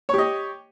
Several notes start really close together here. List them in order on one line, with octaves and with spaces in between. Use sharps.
C#5 G4 D#5